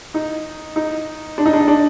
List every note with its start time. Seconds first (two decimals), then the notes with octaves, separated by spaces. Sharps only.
0.14 D#4
0.76 D#4
1.38 D4
1.46 D#4
1.53 D4
1.60 D#4
1.68 D4